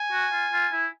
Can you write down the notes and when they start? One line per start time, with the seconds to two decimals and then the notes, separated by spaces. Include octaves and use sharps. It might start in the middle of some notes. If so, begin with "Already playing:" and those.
Already playing: G#5
0.12 F#4
0.32 F4
0.53 F4
0.73 E4